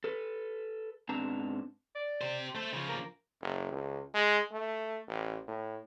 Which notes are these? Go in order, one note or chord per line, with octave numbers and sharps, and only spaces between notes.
A4 B4
G#2 B3 C4 D4 A5 A#5
D5
G4 C5
A3 A4 C5
C#3 F3
A#3
F#1
C#2
G#3
A3
A1
A2